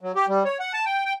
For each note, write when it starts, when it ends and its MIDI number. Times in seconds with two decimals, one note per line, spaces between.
0.01 0.12 54
0.16 0.26 67
0.28 0.43 55
0.45 0.57 73
0.60 0.73 78
0.73 0.85 81
0.86 1.04 79
1.05 1.13 79